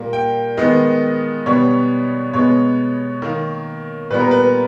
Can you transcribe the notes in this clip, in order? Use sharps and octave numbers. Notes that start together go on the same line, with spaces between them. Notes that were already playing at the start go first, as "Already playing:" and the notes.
Already playing: A#2 G3 A#3
G5
D#3 G#3 B3 D#5
B2 G3 B3 C#5
B2 G#3 B3 C#5
D#3 A#3
A#2 G3 B3 B4
A#4
B4